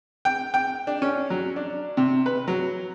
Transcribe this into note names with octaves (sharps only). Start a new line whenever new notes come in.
G5
G5
D4
C#4
F#3
D4
C3
B4
F#3